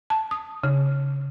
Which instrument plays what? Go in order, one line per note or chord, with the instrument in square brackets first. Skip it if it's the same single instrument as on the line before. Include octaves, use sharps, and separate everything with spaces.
[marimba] A5
D#6
C#3